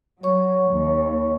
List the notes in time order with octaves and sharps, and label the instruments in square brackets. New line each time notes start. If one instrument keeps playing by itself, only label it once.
[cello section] F#3 [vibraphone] C#5 C#6
[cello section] D#2